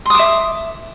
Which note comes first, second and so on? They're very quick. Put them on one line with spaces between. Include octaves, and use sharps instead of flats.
C6 D#6 D6 E5